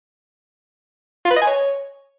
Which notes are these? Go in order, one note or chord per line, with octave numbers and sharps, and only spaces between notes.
F4
B4
D#5
G#5
C#5